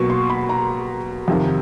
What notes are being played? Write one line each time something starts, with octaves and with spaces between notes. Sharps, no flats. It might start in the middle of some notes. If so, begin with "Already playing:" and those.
Already playing: B2 F#3 A#3 C#6
C6
B5
A#5
F2 C3 D#3